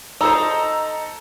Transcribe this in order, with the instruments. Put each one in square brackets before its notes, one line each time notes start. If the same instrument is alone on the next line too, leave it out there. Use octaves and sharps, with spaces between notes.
[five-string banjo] D#4 C5 [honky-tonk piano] A4 A#5 E6